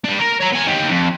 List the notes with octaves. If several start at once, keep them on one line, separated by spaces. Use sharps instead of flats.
G3 D4
A#4
C#5 A#5
B3 G#5
D#4 G4
F2